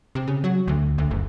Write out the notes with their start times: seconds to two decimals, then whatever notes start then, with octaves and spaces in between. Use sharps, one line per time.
0.15 C3
0.27 C#3
0.44 F#3
0.68 D2
0.98 D2
1.11 F#1